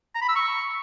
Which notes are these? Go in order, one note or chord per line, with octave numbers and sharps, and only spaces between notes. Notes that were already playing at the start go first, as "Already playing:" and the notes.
A#5
B5
E6
C#6